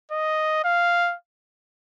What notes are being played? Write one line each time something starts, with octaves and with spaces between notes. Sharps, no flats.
D#5
F5